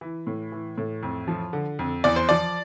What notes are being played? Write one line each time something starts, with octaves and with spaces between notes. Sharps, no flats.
E3
A2
E3
A2
F2
F3
D3
F2
E2 D5
C5
F3 D5